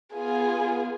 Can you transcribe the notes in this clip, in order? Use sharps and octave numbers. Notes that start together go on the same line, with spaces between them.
B3 F4 G#4 G#5